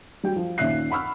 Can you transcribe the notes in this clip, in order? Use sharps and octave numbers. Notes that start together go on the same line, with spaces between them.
G3 F#4 G5
F3
D#2 A#2 C#4 E5 F#6 C7
F#5 B5 C#6 E6 F6